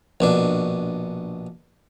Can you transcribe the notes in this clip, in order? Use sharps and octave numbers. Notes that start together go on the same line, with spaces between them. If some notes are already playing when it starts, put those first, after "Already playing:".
A#1 B2 D4